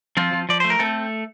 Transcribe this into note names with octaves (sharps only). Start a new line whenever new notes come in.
F3 C4 F4
F3
F3 D5
A3 C5
A#4
A3 C4 A4